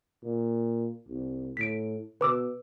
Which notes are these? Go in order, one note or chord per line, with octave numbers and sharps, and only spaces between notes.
A#2
C2
A2 B6 D7
B2 B4 D6 E6